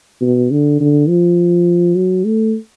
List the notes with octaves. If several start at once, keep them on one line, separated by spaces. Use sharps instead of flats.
B2
D3
D3
F3
F#3
A3